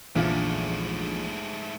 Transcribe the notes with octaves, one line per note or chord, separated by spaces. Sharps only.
A#1 E2 G#2 D3 F3 A3